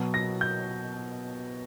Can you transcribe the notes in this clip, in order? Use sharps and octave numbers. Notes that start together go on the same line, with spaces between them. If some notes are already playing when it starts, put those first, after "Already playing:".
Already playing: B2 F#3 B3
A#6
G6